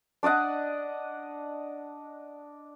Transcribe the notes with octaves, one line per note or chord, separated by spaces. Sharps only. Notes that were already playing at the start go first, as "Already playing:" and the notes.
D4 D5 D#5 F#5